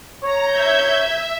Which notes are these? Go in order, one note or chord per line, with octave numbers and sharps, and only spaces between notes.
C#5 A#5
E5 G6 G#6